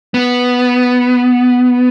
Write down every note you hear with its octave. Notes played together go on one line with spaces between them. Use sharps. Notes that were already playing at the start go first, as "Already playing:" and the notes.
B3